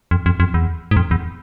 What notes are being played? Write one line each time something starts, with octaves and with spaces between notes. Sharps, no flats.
F2
F2
F2
E2
G#2
F2
E2